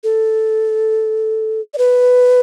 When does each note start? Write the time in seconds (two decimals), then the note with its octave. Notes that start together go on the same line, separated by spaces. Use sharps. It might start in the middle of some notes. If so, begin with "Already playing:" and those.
0.04 A4
1.74 D5
1.78 B4